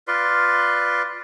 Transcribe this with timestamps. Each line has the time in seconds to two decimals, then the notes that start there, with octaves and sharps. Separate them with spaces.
0.08 F4 B4 D5 C6